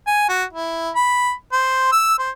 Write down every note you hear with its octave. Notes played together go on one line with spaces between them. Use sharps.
G#5
F#4
E4
B5
C5
E6
C5